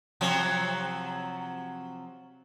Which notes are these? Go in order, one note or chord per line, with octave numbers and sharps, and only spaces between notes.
C3 F3 F#3